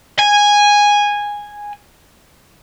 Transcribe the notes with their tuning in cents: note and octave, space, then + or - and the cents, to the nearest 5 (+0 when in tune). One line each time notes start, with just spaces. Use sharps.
G#5 -10